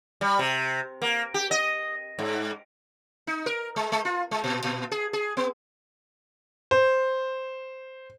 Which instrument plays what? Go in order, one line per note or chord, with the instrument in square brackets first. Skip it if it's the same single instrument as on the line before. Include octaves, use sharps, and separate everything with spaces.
[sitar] G3
C3
A#3
G4
D#5
G#2
D#4
A#4
G#3
G#3
F4
G#3
A#2
A#2
G#4
G#4
B3
[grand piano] C5